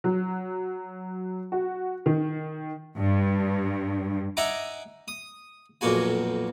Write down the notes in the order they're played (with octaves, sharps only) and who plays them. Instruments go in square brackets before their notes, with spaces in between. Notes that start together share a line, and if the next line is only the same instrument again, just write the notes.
[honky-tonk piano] F#3
F#4
D#3
[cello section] G2
[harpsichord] D#4 E5 F#5 G#5 A#5 D6
D#6
B1 F2 A#2 A#3 F#4 G#5